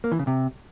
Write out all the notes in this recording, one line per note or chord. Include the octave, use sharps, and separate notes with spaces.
A#3
E3
C#3
C3